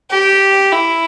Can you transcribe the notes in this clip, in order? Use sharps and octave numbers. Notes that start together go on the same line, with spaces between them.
G4
E4